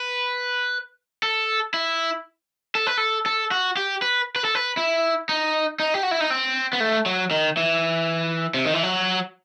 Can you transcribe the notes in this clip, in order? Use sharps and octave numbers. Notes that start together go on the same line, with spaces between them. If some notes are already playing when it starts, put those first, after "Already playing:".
Already playing: B4
A4
E4
A4
B4
A4
A4
F#4
G4
B4
B4
A4
B4
E4
D#4
D#4
G4
F#4
E4
D#4
C4
B3
A3
F#3
D#3
E3
C3
D#3
E3
F#3